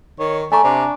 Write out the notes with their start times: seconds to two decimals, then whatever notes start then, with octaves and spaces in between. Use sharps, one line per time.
0.19 D#3 C#5
0.52 A3 D5 G#5 A#5 C#6
0.64 C3 D4